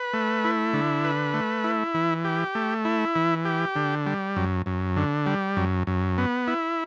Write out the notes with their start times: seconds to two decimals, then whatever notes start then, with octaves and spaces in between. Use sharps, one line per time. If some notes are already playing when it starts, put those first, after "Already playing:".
Already playing: B4
0.14 A3
0.44 E4
0.73 D3
1.04 B4
1.34 A3
1.64 E4
1.94 E3
2.25 G4
2.55 A3
2.85 E4
3.16 E3
3.45 G4
3.76 D3
4.06 G3
4.36 F#2
4.66 F#2
4.96 D3
5.26 G3
5.57 F#2
5.87 F#2
6.18 B3
6.48 E4